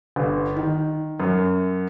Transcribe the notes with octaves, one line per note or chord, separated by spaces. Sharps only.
G1
D#3
F#2